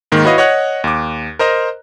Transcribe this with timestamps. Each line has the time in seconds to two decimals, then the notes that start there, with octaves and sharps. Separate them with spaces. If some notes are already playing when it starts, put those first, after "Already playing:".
0.12 G#2 D#3 A#3
0.24 E4 F#4 B4 C#5 D#5 F5
0.38 C#5 D#5 F#5 C#6 F#6
0.84 D#2 D6
1.39 A#4 C5 D#5 A#5